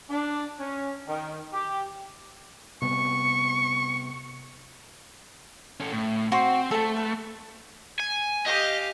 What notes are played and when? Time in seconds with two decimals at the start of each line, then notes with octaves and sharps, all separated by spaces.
0.10 D4
0.60 C#4
1.08 D#3
1.53 G4
2.82 C3 G3 B3 C#6
5.80 C#4 A4
5.92 A2
6.32 C4 F#4 C6
6.71 A3 A4 A5
6.96 B4
8.00 G#5
8.46 G4 D#5 F5